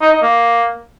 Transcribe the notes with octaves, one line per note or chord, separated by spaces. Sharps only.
D#4
D#4
A#3